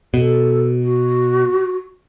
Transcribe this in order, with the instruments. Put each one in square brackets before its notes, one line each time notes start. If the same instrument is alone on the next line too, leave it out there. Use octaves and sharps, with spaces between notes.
[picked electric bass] B2 [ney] A4
[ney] F#4